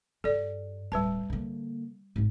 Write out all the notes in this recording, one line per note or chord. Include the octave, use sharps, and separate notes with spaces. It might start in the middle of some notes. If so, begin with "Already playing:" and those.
G2 A4 D5
D1 G3 B4 A5
D3 A#3
G#1 D4